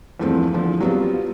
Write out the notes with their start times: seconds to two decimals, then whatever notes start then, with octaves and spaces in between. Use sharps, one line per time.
0.20 E2 G2 F3 A3 C4
0.54 E2 D3 F3 B3
0.81 F#3 G3 B3 C4 F4